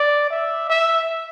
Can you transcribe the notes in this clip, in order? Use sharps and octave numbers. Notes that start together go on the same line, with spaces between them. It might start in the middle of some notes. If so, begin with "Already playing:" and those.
Already playing: D5
E5
E5